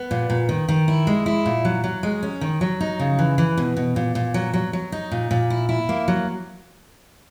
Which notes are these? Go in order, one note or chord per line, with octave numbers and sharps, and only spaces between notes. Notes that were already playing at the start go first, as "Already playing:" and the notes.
Already playing: B3
A#2
A#2
D#3
D#3
E4
G#3
E4
A#2
F#3
F#3
G#3
C#4
D#3
F#3
D#4
C#3
E3
E3
B2
B2
A#2
A#2
F#3
F#3
F#3
D#4
A#2
A#2
E4
E4
A#3
F#3